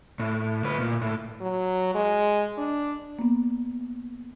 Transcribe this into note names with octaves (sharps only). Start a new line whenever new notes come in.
A2
D2 B4
A#2
A2
F#3
G#3
D4
A#3 B3